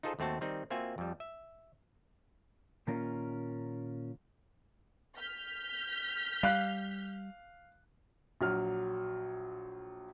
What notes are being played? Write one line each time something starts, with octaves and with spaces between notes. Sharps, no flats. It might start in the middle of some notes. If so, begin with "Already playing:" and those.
D#4 F4 G#4 A4 C5
D#2 A3 C4 F#4 A5
D#3 G3 C4 D#4
A#3 C4 F4 F#4 E5 G#5
F2 G3
E5
A#2 D#3 A#3 C#4 F4 A#4
F6 G6 B6
G3 F5 F#6
A#1 F#3 F6